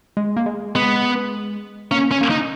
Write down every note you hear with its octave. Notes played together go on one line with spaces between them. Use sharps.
G#3
A#3
G#3
G#3 B3
A#3 C#4
C#4
A#3
D#4